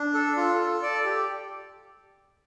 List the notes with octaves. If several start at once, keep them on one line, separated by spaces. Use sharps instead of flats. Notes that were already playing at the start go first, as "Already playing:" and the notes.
Already playing: D4
A4
F4
A4
D5
G4